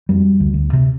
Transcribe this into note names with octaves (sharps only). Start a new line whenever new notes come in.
F2 G3
D2
D2
C3